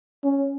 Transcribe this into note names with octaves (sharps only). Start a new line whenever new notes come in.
C#4